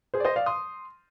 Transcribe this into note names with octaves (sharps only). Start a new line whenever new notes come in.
G#4 C5
D5
C5 D#5
D5 F5
C6 D#6